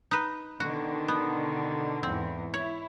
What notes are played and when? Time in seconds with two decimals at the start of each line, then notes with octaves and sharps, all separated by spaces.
0.11 D#4 B4
0.60 B2 D3 D#3 F#4
1.08 B3
2.03 E2 G#2 C4
2.54 E4 C#5